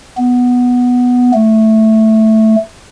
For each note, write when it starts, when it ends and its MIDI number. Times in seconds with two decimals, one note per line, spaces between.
0.18 1.31 59
1.34 2.56 57